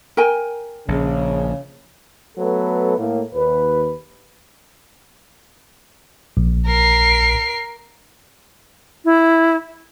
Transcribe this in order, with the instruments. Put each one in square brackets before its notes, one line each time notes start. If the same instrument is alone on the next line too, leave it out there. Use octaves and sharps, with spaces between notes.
[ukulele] A#4 G5 G#5
[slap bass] A#1 [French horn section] C#3
[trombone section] F#3 A3 B3 A4 B4
A2 A#3
D#2 B4
[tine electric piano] A#1
[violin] A#4 C7
[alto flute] E4